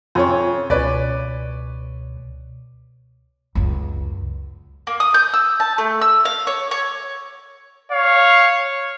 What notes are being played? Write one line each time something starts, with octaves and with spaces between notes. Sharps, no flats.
F2 C#4 F4 C#5 G#5
C#2 B2 C#4 B4 D5
C#2 F#2
A#3
D#6
G6
E6
A5
A3
E6
F5
C#5
C#5
C#5 F5